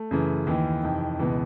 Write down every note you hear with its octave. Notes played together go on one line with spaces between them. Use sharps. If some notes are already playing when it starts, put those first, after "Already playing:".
Already playing: A3
F#2 C#3 E3
D#2 D#3 E3
F2 C3 D#3
C#2 B2 E3